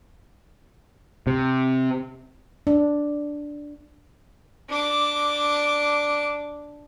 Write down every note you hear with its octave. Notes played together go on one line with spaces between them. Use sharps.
C3
D4
D4 D6